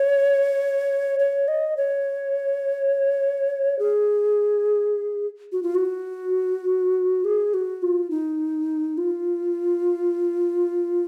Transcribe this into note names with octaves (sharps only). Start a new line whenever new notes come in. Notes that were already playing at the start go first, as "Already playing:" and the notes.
Already playing: C#5
C#5
D#5
C#5
G#4
F#4
F4
F#4
G#4
F#4
F4
D#4
F4